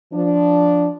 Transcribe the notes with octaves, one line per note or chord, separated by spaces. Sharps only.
F3 D4